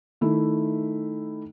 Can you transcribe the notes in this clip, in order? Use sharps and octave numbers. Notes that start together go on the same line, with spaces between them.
D#3 A3 E4